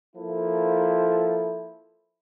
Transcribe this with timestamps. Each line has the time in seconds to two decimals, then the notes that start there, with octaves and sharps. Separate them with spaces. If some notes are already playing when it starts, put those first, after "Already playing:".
0.16 F3 A#3 E4 A4